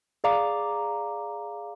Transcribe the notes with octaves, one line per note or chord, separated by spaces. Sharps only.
G#4 D5 F5 A#5 D6